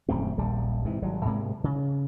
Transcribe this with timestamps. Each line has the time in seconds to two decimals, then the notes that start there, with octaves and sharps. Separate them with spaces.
0.09 D#1 F#2 A3 C4
0.38 D#1 A#1 G3
0.85 G#2 C3 E3
1.02 G#1 F#3 G3
1.25 G#2 C3 G#3 A#3
1.64 C#3